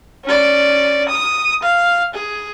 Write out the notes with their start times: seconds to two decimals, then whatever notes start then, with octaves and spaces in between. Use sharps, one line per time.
0.24 C#4 D5
1.09 D#6
1.63 F5
2.14 G#4